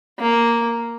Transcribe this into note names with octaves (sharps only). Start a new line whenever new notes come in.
A#3